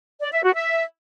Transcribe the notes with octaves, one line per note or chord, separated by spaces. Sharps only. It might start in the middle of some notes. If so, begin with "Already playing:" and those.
D5
E5
F#4
E5